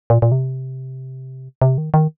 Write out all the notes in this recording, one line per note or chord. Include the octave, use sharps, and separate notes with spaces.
A#2
A#2
C3
C3
D#3
D#3